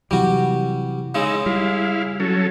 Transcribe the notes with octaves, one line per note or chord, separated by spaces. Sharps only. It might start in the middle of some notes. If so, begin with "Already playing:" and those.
C3 E3 F#3 G3 F#4
C#3 G#3 D#4 E6
G3 E4 F5
F#3 C#4 A4